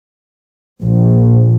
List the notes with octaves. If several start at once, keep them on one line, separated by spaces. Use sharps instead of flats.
A#1